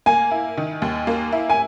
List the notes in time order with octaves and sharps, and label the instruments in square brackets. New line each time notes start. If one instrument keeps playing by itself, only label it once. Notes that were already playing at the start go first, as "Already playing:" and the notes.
[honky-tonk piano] A#3 [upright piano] G#5
[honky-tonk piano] E4
D#3
D#2
A#3
E4
[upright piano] G#5